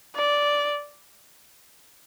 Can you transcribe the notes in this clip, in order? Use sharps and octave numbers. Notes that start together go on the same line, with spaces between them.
D5